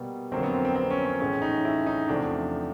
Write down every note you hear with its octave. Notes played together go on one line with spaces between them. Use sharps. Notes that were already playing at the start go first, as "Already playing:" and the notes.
Already playing: B2 G3 A#3 B3
F2 D3 F#3 A#3 C4
B3
C4
C4
C4
C#4
C#4
A2 E3 G#3 C#4
D#4
E4
D#4
E2 C3 F3 A3 D4